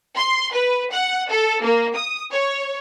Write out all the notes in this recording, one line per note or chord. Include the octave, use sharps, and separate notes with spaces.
C6
B4
F#5
A4
A#3
D#6
C#5